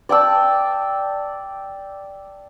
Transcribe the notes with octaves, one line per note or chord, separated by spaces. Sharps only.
D5 G5 A5 E6